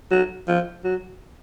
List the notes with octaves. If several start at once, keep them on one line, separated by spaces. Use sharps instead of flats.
F#3
F3
F#3